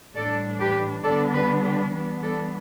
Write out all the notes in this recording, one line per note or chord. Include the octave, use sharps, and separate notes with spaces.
A2 E3 G3 D4 A4 D5
G4 B4
D3 G3 B3 D4 A4 D5
G4 B4
G4 B4
E3 G3 B3 D4
A4 D5